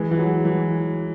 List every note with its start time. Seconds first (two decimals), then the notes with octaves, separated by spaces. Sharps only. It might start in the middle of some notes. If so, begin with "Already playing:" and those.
Already playing: E3 G#3
0.11 E3
0.19 F#3
0.45 E3